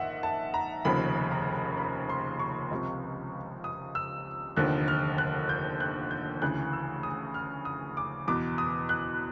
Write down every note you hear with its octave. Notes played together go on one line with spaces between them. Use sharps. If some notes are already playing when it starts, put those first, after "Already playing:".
Already playing: A#1 G#2 D#3 D#5 E5 F#5
A5
A#5
F1 D#2 C#3 F3 B5
A#5
B5
C6
C#6
C#2 C3 F3
D#6
E6
F1 D#2 D3 F3 F#6
F6
F#6
G6
F#6
G6
D2 C#3 E3 F#6
E6
D#6
F6
D#6
D6
E2 B2 D6
D#6
F#6